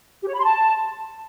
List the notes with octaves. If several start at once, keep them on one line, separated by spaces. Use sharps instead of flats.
G4
C#5
B5
C6
A5